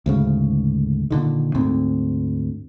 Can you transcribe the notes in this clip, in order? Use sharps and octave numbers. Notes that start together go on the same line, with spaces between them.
D2 G#2 C#3
A#2 D3 D#3
D2 G#2 C4